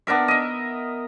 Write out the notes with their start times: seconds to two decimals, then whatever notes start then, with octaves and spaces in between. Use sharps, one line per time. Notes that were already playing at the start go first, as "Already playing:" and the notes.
0.07 B3 D4 A#4 E5
0.28 D#5 E5